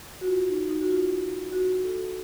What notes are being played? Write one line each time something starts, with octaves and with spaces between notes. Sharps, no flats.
F#4
F4
D#4
D#4
F#4
F4
F#4
A4